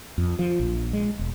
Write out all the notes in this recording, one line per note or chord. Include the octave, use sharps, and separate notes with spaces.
F2
F3
A#1
G#3
E1